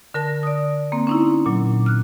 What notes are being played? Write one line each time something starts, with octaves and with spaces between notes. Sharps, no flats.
D3 A#4 A5 A#6
D5 D#6
A#3 C4
C#4 D#4 E4
A#2 F#3
F6 F#6